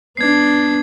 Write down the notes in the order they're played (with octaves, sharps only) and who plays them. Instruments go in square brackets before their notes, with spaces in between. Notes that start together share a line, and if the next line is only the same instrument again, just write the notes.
[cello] B3 D4 [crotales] G#6 C7